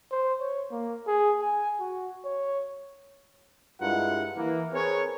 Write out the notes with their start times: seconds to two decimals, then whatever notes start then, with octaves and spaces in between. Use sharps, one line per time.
0.11 C5
0.40 C#5
0.71 A#3
1.07 G#4
1.42 G#5
1.80 F#4
2.25 C#5
3.81 G2 G#3 E4 F4 A#4 F#5
4.36 E3 A#3
4.73 C4 G#4 A#4 B4 C#5